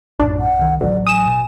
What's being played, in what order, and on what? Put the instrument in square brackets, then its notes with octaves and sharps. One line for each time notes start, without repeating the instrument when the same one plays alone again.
[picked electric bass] A#1 F#2 A2 [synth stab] D4
[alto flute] F#5
[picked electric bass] C2 D#3
[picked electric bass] A1 F#3 [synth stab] D2 [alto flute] D5
[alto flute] G#5 [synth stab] D#6 E7
[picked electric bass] B2